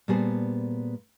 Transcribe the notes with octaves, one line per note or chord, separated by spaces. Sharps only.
A#2 G3 B3 G#4 C5 A5